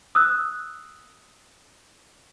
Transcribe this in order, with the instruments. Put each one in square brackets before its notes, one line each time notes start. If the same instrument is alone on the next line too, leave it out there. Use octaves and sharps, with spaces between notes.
[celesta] D#6 E6 F#6